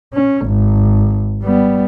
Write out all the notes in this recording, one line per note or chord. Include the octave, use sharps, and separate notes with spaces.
C#4
G#1
G3 B3